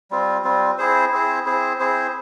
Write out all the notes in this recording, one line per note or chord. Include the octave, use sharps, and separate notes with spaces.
G3 C4 F4
G3 C4 F4
C4 E4 G#4 C5
C4 E4 G#4 C5
C4 E4 G#4 C5
C4 E4 G#4 C5